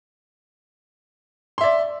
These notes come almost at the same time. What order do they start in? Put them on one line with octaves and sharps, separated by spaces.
C6 E5 D5